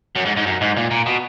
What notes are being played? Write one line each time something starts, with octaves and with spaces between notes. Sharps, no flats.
F#2
G#2
G#2
F#2
G#2
A#2
A#2
B2